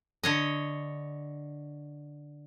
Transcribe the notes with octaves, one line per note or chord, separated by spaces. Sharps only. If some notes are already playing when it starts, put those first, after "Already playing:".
D3 C#5 D#5